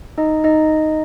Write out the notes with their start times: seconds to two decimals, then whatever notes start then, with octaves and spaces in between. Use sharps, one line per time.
0.18 D#4 D#5
0.44 D#4 D#5